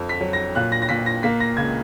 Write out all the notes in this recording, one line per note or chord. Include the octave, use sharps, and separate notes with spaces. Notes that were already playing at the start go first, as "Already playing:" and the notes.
Already playing: F2
B6
F#3
A#6
A#2 F#6
A#6
A#6
A#2 B6
A#6
A#3 B6
A#6
C#2 G#6